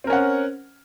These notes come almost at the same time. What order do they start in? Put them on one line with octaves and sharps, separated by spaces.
C4 A#4 C#4 F#5